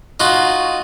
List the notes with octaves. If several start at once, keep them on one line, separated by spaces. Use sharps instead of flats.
D#4 F4 F#4